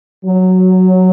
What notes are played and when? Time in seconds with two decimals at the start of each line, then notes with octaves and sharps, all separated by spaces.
0.25 F#3